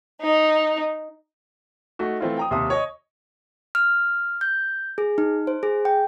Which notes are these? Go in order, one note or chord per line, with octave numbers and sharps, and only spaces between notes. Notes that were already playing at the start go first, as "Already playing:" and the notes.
D#4
A3 D#4 F#4
E3 A3 C4 E4 F4
G5 A#5 D#6
D#2 C3 E5 C6 D#6
C#5 D#5
F6
G6
G#4
D#4
C5
G#4
G5